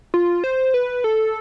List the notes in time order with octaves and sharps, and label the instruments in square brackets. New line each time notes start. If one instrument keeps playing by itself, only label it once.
[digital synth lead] F4
C5
B4
A4